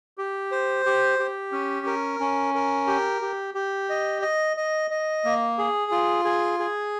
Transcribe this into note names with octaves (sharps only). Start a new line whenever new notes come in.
G4
C5
G4
G4
C#4
A#4
C#4
A#4
G4
G4
G4
D#5
D#5
D#5
D#5
A#3
G#4
F4
G#4
G#4